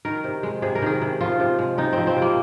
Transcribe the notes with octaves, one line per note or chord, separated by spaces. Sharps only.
D#3 A#4
C3
G#3
C3 G#4
A#4
D#3 G#4
C3
F3 F4
C3
G#3
C3 D#4
F3 C4
C4
C3
A#3